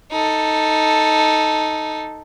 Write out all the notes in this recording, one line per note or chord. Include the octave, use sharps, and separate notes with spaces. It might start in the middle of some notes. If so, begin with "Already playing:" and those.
D#4 A4